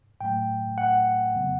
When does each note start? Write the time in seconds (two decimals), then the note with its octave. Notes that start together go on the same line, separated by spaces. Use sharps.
0.21 A2 F#3 A3 G5
0.78 F#5
1.35 F2 C#3 F#3 B3